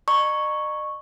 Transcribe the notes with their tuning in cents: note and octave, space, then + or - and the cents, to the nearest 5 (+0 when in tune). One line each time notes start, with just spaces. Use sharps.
D#5 -45 A#5 +0 C#6 -5